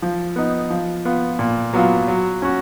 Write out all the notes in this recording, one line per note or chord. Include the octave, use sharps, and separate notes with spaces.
F3
B3 D#4
F3
B3 F4
A#2
F#3 B3 F4
F#3
C#4 F#4